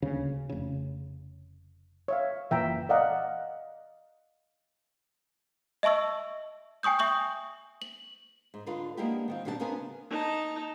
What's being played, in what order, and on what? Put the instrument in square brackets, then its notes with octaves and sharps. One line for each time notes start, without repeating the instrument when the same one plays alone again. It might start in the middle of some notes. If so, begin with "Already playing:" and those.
[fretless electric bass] D#1 D2 C#3
F1 C#3
[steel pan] C#5 E5 F5
[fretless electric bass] F#1 A#2 E3 [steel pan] E5 G5 A#5
[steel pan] D5 D#5 F5 F#5 A#5
[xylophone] D#5 E5 A5 C#6 E6
G5 G#5 C#6 D#6 G6
E5 C#6 D#6 G6
F#7
[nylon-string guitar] G#2
D3 D4 D#4 F4 B4
G#3 A#3 B3 D4 E4 G4
D#3 C4 F4
B2 G3 D4 D#4 D5 A5
C#3 B3 D4 A#4 C5 G#5
[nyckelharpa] D#4 A5